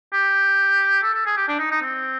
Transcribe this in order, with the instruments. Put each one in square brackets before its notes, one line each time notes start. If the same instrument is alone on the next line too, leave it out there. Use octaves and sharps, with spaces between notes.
[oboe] G4
A4
A4
G#4
G4
D4
D#4
D#4
C4